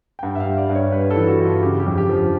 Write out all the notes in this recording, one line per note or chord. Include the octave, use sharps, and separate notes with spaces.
G5
G2 F#5
E5
F5
G3
D5
G2
C#5
G3 B4
A4
E3
F#4
G2
F4
C#3 G4
G4
F2
G4
F3